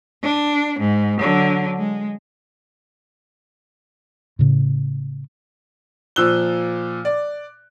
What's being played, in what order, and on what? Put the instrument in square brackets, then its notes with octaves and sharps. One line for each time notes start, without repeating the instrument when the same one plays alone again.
[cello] D4
G#2
D3 F#3
G#3
[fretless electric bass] A2 C#3
[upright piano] A#2 F3 E6 F#6 G7
D5